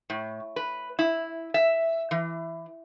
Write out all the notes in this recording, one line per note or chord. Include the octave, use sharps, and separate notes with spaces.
A2
B4
E4
E5
E3